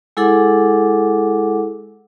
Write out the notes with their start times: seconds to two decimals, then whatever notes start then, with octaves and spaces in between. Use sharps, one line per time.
0.17 G#3 E4 G#4 A4 F#5 D6